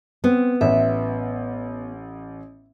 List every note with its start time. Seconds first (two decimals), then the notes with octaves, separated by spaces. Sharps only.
0.24 B3 C4
0.61 A1 E5